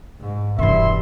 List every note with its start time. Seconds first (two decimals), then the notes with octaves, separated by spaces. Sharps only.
0.21 G#2
0.59 E1 G2 E3 E4 E5 C6